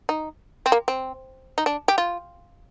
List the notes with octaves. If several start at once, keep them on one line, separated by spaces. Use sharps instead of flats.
D#4
C4
A#3
C4
D#4
D4
G4
F4